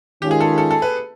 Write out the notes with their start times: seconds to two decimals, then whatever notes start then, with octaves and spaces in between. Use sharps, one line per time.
0.22 D#3 G#3 C#4 F4 G4
0.31 G#4
0.40 A4
0.58 A4
0.71 A4
0.82 B4